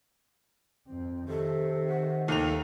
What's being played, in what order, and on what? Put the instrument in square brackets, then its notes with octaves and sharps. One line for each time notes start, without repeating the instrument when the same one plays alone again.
[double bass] F2 C4
[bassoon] C3 [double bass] D#3 [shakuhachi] A4
[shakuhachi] F#5
[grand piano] D#2 F7 [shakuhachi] A4